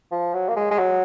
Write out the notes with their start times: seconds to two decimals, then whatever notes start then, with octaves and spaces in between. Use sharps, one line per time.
0.11 F3
0.34 F#3
0.48 A#3
0.56 G#3
0.71 G#3
0.79 F#3